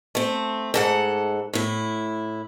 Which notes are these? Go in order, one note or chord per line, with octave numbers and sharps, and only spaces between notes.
A3 C4
G#2 A4 F#5
A2 E4